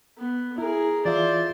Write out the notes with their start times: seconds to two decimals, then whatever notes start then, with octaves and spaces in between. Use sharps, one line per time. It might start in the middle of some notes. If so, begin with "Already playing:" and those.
0.17 B3
0.58 E4 G#4 A#4
1.05 E3 F4 C5 D5 E5